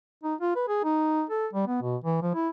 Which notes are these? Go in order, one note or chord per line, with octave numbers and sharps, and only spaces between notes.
D#4
F4
B4
G#4
D#4
A4
G3
B3
B2
E3
F3
E4